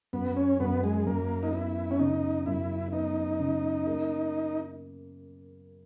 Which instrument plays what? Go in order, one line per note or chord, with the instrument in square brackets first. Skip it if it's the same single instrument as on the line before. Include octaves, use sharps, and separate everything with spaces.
[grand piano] F#2 [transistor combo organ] B3
[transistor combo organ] C#4
[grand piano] F#2 [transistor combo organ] B3
[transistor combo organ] G#3
[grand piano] F#2 [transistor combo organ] A#3
[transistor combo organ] D#4
[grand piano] B3 [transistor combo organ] E4
[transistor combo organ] C#4
[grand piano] C#3 [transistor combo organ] D#4
[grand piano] F#2 [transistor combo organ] E4
[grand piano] B3 [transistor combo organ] D#4
[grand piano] C#3
A#3